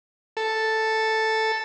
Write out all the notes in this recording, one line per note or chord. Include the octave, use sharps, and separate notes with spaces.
A4